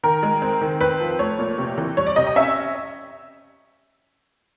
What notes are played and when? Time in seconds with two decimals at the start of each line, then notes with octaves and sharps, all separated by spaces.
0.03 D#3 A#4
0.23 G#3
0.42 C4
0.61 D#3
0.81 C4 B4
1.00 F3
1.19 A3 C#5
1.39 A#2
1.58 C3
1.78 E3
1.97 G3 C#5
2.06 D5
2.16 C3 D#5
2.27 D#5
2.36 C#4 E5